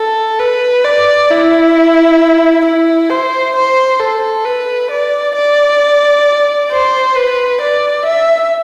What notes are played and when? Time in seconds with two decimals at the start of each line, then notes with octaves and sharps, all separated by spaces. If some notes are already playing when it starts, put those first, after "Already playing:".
Already playing: A4
0.39 B4
0.84 D5
1.30 E4
2.65 E4
3.10 C5
3.55 C5
3.99 A4
4.45 B4
4.90 D5
5.35 D5
6.71 C5
7.15 B4
7.61 D5
8.05 E5